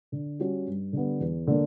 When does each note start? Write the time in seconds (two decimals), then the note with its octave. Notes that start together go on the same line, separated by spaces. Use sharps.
0.12 D3
0.39 G3 C#4 F#4
0.67 G2
0.93 D3 G3 B3
1.20 E2
1.47 D3 A#3